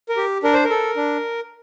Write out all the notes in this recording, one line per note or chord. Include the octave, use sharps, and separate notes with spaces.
A#4
G4
D4 A#4
C5
A#4
A4
D4